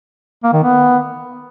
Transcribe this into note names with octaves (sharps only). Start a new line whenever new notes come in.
A#3
D#3
B3